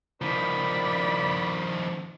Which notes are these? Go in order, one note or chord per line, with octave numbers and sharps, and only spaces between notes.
D#3 F3 D5 B5